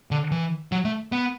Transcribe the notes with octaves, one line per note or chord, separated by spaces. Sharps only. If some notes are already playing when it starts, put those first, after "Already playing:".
D3
E3
F#3
A3
B3